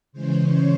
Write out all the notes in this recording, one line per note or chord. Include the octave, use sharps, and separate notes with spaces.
C#3 E3 G#3 C#4 C5
C#5